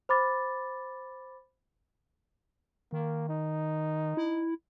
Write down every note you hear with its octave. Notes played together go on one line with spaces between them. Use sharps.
C5 B5 D6 A6
D#3 A#3
D#4
E4